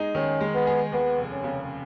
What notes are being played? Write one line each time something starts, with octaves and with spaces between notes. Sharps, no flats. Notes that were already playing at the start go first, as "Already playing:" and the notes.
Already playing: G#3 D#4 G#4
D#3 C#4
G#3
B3
G#4
D#2 B3
F1
C#4
C#3